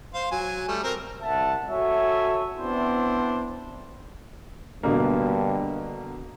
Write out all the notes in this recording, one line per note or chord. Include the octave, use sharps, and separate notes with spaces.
C5 F5
F#3 G#5
G3 A3
C4 A#4 A#5
C2 E5 F#5 A5
F#4 A4 C#5 E5 G#5
B3 C4 D4 E4 C5
G2 B2 D3 A#3